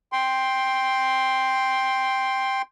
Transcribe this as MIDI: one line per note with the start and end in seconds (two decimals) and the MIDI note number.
0.13 2.62 79
0.13 2.62 84